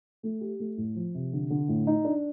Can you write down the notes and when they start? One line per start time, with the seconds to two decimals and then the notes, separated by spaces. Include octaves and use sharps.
0.23 A3
0.41 G4
0.59 A3
0.77 A2
0.95 F3
1.14 C3
1.33 D3
1.50 D3
1.68 A2
1.87 D#4
2.04 D4